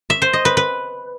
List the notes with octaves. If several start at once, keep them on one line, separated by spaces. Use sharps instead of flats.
E5
C5
D#5
B4
B4